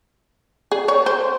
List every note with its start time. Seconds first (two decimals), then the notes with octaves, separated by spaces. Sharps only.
0.72 G#4
0.88 C#5
1.06 C5